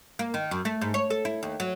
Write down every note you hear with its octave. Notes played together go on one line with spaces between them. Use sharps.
A#3
D#3
F#2
A3
G#2
C#5
A4
E4
D#2
F#3